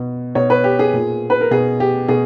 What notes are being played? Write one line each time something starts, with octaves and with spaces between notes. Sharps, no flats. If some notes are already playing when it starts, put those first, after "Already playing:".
Already playing: B2
B2 C#5
B4
G4
G#4
A#2
B4
A#4
B2 G#4
G4
B2 G#4